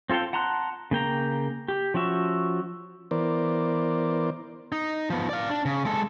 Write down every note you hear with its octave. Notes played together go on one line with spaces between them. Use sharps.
C4 F4 A4 F5 G5
F#5 A5 A#5 C6 F#6
C#3 A#3 G5 A#5
G4
F3 C#4 F#4 E5
E3 B3 A#4 C5 D5
D#4
F3 B3
D5 F5
D4
C#3
G#3 A4